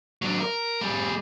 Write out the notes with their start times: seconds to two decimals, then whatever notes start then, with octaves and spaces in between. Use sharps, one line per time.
0.22 F#3 D4
0.41 A#4
0.81 G3 G#4